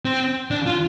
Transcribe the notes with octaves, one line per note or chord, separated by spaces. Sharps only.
C4
D4
F4